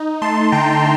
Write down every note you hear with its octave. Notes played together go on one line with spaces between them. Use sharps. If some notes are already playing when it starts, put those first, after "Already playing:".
Already playing: D#4
A3 A5 C6
D3 G5 A#5